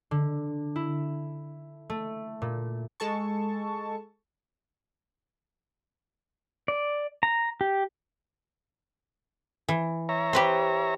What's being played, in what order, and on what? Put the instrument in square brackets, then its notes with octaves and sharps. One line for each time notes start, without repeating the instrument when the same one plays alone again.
[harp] D3
E4
A3
A#2
[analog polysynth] G#3 A4 A5 C#6
[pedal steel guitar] D5
A#5
G4
[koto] E3
[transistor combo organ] C#5 E5 A#5
[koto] G4 B4 C5